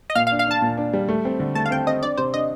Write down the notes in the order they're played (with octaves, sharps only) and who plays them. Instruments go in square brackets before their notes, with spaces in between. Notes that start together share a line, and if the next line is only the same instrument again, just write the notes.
[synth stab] D#5
[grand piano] A#2 [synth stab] F5
[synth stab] F5
[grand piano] D4
[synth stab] F5
[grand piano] D4 [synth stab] A5
[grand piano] A#2
D4
G3
A3
C4
D3
[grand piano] A3 [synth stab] A5
[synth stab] F5
[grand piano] C4 [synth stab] G5
[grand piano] C4 [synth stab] D#5
[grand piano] D4 [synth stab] D5
[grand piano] C3 [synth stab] C5
[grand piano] D4 [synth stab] D#5